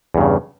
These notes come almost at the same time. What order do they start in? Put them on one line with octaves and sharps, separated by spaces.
E2 G2 C#3